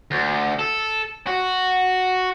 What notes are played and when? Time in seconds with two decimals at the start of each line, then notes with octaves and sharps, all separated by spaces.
0.11 D2
0.59 A4
1.27 F#4